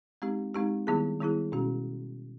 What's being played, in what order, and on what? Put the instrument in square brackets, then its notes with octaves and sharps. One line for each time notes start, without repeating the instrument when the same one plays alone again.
[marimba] G#3 C4 D#4 G4
G#3 C4 D#4 G4
D#3 G3 B3 E4 G#4
D#3 G3 B3 E4 G#4
B2 G#3 C#4 F#4